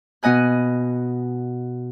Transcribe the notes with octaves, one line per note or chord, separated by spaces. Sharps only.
B2 B3 D#5 G#5 F#6